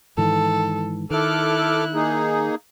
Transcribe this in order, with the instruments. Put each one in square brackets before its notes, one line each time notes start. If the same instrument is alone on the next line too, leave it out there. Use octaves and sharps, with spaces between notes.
[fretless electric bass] G#2 D#3 E3 [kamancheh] A4
[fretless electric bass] D#3 [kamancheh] E4 F#6 [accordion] A4 D6 F6
[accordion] A#3 D#4 G#4